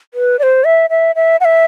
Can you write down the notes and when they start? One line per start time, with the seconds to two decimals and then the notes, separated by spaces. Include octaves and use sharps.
0.14 B4
0.39 D5
0.43 C5
0.64 E5
0.90 E5
1.16 E5
1.41 F#5
1.45 E5